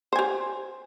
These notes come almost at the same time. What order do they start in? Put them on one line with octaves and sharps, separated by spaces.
C5 G#5 G4